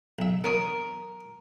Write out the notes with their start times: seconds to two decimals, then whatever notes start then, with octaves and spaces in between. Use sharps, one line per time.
0.19 B1 E5
0.44 B3 A#4 C#5 D#6